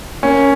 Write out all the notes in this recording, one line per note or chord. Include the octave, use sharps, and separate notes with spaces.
A#3 C#4